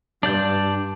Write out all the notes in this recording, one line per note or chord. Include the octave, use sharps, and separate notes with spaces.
G2 D4 D5 G6